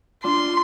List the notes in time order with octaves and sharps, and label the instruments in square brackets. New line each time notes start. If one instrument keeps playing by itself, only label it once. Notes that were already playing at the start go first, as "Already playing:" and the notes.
[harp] D4 F4 [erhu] C6